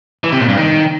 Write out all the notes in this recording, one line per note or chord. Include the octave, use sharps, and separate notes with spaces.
E3
C3
A#2
G2
D#3